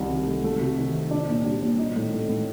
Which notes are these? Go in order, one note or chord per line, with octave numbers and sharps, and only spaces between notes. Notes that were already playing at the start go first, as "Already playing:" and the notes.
Already playing: C2 D#3
C3
A3
A3
C3
D#3
C4
D4
A#2
G3
A#2
D#4
A2
A3
A2